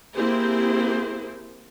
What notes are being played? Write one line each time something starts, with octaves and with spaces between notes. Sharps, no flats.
A#3 C4 E4 G4 G#4 C5